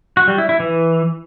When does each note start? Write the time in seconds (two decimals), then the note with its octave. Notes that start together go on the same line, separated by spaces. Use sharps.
0.17 F#4
0.28 G3
0.38 E4
0.49 E4
0.60 E3